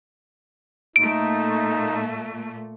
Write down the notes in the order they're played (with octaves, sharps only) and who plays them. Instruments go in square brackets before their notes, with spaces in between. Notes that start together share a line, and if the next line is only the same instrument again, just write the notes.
[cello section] A#2 A3 [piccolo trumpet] D#4 [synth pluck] D7